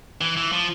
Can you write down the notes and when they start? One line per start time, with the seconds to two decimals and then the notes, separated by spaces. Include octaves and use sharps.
0.21 E3
0.37 E3
0.52 F3